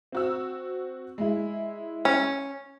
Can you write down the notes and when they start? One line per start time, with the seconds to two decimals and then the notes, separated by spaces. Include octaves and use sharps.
0.12 C4 F#4 E6
1.18 G#3 E4
2.05 C#4